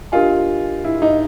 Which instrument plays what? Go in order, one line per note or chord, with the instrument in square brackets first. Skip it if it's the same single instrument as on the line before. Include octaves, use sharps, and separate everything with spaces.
[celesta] D4 G4 A#4 D#5 G#5 [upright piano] F4
[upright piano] E4
D#4